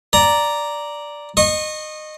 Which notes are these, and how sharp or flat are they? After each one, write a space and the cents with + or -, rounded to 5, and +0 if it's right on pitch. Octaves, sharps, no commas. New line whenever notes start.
D5 -5 A#5 +0
D#5 -20 C#6 -30